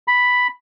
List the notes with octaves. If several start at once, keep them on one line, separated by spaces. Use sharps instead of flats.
B5